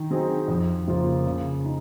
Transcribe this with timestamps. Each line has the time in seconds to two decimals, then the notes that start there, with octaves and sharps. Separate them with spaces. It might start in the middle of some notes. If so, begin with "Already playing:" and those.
Already playing: D#3
0.11 F#3 C4 D#4 G#4
0.48 F2
0.88 C#3 F3 A#3 F4
1.26 C#3
1.65 D#4